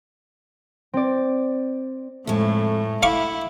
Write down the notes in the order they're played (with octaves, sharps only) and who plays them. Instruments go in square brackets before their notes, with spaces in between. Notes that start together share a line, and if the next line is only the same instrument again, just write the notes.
[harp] C4 D5
[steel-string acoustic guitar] F2 G#3 [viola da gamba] A2 [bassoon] A3
[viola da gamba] E4 [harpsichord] F5 C#6 D6 [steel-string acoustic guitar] F#5